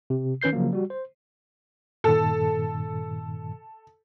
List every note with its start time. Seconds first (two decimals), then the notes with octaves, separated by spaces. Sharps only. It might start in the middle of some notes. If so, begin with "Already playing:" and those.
0.10 C3
0.42 D#3 C#4 B4 G6 C7
0.53 C#3 F3 F#3 A#3
0.73 G3 F#4
0.90 C5
2.04 G2 A#2 D#3 A4